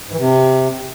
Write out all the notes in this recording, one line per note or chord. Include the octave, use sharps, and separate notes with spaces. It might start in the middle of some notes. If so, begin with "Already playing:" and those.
G#2
E3
C3